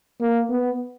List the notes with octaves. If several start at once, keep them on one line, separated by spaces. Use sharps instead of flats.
A#3
B3